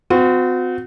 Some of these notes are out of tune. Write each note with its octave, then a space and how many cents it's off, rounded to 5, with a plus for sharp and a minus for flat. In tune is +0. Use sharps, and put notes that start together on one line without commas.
C4 -40 F#4 -35